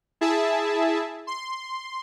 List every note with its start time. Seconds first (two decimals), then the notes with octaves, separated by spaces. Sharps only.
0.21 E4 G#4 E5 A5
1.27 C6